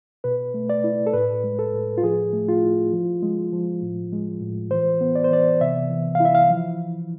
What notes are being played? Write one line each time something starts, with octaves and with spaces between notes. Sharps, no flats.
B2 B4
A3
D5
E4
A4
A2 B4
G#3
A4
A2
F4
F3 G#4
A3
F4
E4
F3
G#3
F3
A2
G#3
A2
E3 C5
B3
D5
C5
E3 D5
C3 E5
E3
F5
E4
E5
F5
F3